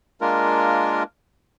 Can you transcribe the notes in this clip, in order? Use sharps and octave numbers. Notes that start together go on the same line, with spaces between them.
G#3 A#3 D4 F4 A#4